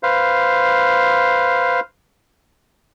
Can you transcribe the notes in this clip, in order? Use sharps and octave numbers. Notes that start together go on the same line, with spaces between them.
B4 C5 F5